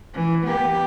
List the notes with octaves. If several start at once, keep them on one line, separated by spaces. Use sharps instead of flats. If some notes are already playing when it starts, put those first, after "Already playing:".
E3
B3 G4